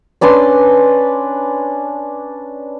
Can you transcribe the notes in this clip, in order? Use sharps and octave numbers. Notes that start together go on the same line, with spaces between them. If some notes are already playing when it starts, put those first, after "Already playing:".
C#4 D4 B4 C6